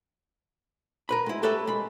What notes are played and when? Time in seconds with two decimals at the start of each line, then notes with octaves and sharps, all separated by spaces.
1.09 A#4 B4 B5
1.26 G#3 E4
1.43 G4 A4 B4 C#5 E5
1.67 G#3 B5